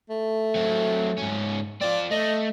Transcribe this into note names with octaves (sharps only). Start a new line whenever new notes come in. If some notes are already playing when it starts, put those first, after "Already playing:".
A3
F#3 C4
G#2 C#4
C4 F4 D5
A3 D#5